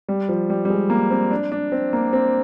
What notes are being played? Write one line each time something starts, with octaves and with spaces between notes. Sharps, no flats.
G3
F3
G3
G3
G#3
A#3
C4
D4
D4
C4
A#3
C4